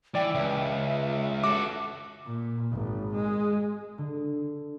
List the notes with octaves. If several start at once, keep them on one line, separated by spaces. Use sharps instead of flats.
E3 D5 G5
C#2 E5
F#4 A4 D6
A#2
G#1
G#3
D3